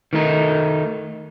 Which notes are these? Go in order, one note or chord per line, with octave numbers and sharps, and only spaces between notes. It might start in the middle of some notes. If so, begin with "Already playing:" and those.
D#3 A3 D#4